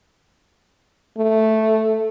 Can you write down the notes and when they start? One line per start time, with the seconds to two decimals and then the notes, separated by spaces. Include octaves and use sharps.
1.18 A3